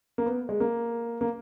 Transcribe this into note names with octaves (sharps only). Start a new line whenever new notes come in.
A#3
B3
G#3
A#3
A#3